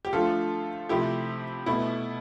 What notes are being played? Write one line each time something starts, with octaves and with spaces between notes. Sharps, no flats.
G4
D3 F3 A3 F4 A4
C3 F3 A3 E4 G4
B2 A3 E4